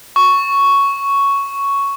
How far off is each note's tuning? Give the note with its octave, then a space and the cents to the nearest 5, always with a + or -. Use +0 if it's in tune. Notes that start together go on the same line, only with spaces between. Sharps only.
C#6 +5